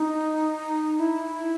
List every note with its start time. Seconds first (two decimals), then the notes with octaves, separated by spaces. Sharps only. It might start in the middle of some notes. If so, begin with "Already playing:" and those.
Already playing: D#4
0.99 E4